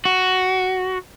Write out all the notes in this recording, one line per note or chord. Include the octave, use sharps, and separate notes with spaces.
F#4